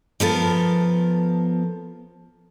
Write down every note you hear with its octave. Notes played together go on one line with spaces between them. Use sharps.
F3 B3 A4 A#4